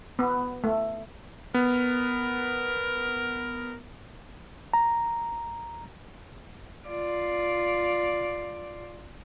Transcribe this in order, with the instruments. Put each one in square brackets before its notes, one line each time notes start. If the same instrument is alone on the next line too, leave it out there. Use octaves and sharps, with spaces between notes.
[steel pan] B3
A3
[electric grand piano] B3 [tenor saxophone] A#4
[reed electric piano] A#5
[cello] F4 D5